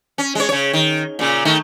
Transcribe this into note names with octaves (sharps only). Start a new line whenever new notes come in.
C#4
G#3 C#5
C#3 C#5
D#3
A#2 C#3
D#3 A3